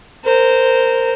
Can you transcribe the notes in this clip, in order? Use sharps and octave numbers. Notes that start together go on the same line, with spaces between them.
A#4 C5